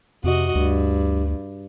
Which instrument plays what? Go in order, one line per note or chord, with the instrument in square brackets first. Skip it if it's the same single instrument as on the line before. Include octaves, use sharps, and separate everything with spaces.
[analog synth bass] F2 [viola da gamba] C3 F#4 D#5
[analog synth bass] D2 [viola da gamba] G2